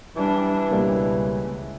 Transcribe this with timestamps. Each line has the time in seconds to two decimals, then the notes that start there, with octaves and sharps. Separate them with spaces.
0.16 E3 G3 D4
0.71 C#2 B2 G3 A#3